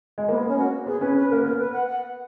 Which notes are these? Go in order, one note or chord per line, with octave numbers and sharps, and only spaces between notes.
G#3
A#3 B3
B3
C#4
F#4
B3 G#4
C#4 B4
B4
A#3 A#4
B3 A#4
B4
F#5
F#5